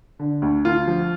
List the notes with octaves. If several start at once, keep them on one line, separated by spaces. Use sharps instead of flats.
D3
D2
D2 F4
F3